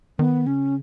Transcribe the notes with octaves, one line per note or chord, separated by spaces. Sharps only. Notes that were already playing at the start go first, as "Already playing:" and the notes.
D#3 B3
C#3 C#4